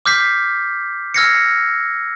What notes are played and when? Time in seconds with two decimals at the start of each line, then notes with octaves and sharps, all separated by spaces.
0.06 D6 F6 G6 B6 C7
1.14 E6 F6 G#6 A#6 C7 C#7